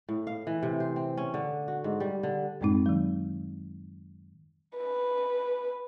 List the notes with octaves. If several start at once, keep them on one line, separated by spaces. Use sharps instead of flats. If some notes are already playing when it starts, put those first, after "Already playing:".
A2
F5
E3
C3
C5
C4
C#4
D3
F#4
G#2
G3
D3
F#2 A2 G#3 C4 D#4
D#3 F#3
B4